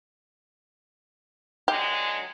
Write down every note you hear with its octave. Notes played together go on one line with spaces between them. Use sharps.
D3 F#3 G#3 G4